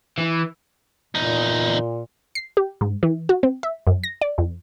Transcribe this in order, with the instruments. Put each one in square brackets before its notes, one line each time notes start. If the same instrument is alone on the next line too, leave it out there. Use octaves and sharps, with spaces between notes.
[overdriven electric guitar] E3
[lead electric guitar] E2 D#4 [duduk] A#2
[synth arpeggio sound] C7
G4
G#2
E3
F#4
C4
E5
F#2
A#6
D5
F2